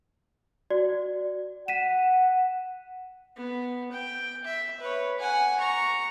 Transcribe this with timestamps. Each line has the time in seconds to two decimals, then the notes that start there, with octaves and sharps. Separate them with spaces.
0.70 F#4 D5
1.68 F#5 B6 D#7 E7
3.37 B3
3.92 G5
4.45 E5
4.80 B4 C#5
5.19 F#5 G#5
5.60 A#5 C#6